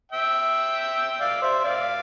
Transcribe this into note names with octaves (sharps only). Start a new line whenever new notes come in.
E5 G5
D5 F5
C5 E5
D5 F5